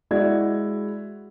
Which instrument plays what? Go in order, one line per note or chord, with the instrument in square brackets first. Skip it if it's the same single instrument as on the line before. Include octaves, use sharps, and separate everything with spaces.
[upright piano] G#3 E4 F#4 D5 G#6